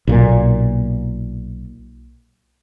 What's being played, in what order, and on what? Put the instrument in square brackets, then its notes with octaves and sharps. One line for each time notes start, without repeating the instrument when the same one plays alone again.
[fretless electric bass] B1 A#2